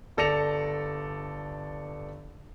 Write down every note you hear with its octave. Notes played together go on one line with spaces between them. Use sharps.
G1 A4 D5 A#6 C#7 F7